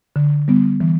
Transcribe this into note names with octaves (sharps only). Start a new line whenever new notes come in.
D3
G3 B3
E3